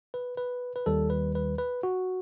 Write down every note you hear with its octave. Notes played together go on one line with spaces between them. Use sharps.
B4
B4
B4
D#2 D#3 G3 A4
B4
B4
B4
F#4